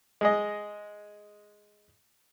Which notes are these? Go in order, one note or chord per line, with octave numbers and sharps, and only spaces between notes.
G#3 G#4 D#5